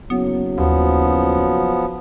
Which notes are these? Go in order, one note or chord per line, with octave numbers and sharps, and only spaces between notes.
F#1 F#3 B3
D#2 F3 B3